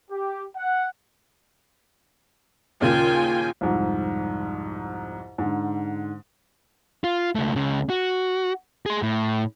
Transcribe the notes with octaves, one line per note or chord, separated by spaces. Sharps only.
G4
F#5
D#2 A#2 C#3 F4 G5 G#5
C2 F2 G#2
G#2 D3
F4
C#2 A3
C#2 C#3
F#4
G#4 C6
A2